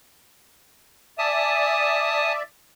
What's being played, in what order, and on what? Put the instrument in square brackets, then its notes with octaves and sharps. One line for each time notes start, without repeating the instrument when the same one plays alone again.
[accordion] D5 E5 [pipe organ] G#5 A5 D#6